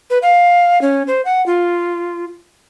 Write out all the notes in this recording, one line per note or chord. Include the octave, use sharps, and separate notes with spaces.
B4
F5
C#4
C5
F#5
F4